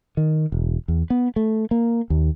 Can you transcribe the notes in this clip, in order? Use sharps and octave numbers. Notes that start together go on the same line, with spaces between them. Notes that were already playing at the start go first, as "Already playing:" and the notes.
D#3
E1
E2
B3
A3
A#3
D#2